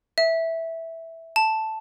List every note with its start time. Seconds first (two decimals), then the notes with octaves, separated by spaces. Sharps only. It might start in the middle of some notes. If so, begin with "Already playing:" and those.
0.18 E5
1.36 A5